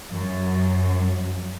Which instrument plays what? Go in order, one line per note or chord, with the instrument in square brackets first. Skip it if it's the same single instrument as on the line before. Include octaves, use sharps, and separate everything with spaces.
[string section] F#2